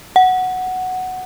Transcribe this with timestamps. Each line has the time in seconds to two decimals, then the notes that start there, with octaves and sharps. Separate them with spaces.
0.16 F#5